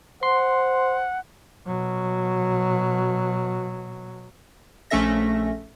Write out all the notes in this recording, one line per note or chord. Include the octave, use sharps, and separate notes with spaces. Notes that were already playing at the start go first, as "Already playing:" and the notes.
C5 F#5 C6
B2 F#3
A#1 A3 C#4 A4 E5 A#6